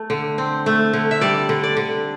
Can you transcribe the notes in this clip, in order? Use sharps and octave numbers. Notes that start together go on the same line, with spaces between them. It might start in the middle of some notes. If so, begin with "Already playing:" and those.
Already playing: A3
D3
C4
A3
D3
E5
G3 D5
D3
D5
D3